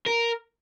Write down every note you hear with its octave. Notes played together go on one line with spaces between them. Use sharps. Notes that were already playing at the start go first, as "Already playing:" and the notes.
A#4